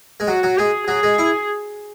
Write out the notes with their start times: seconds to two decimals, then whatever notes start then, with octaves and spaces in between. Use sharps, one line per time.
0.20 G#3
0.27 F#3 F#4
0.43 F#3
0.58 G#3 G#4
0.88 F#3 G#4
1.03 G#3
1.18 E4